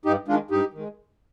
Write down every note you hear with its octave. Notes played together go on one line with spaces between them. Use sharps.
G2 D#4 G4
D#3 G#3 D4 F4
G2 D#4 G4
D#3 G#3